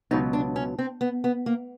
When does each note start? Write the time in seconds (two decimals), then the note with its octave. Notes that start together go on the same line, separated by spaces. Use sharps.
0.11 C#2 B2 F#3 B3 D#4
0.33 D4
0.56 C#4
0.79 C4
1.01 B3
1.24 B3
1.46 A#3